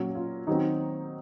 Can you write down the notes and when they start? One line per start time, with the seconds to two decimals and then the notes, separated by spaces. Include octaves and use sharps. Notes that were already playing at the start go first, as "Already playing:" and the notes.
Already playing: A#2 F#3 C#4
0.15 F4
0.47 D#3 F#3 C4 D#4